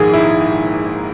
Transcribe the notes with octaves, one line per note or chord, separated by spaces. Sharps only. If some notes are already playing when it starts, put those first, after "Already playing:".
Already playing: A#1 G#2 D#3 A#3 G#4
E4